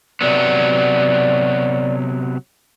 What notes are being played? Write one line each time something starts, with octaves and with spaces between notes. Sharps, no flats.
C3 F#3 B3 D5